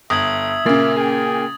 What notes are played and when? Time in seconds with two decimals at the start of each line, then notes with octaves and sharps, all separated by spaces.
0.10 G1 E5 D#6 G#6 F#7
0.66 A#2 C#3 A#3 A6
0.95 G#4 G5